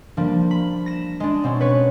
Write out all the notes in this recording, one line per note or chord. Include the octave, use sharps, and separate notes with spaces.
F3 G3 A#3 D4
B5
A#6 E7
G#3 D4
B2 C4 C#4
B4 C#5